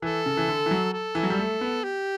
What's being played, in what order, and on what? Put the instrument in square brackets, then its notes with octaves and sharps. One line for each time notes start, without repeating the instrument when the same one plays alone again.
[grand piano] E3 [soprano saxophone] A4
[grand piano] C#3
E3
D3
E3
F#3
[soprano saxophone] A4
[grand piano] E3
F#3
G3
A3
B3
[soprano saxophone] G4